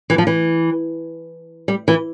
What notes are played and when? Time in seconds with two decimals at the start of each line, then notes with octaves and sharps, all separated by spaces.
0.10 E3
0.18 F3
0.27 E3
1.68 G3
1.88 E3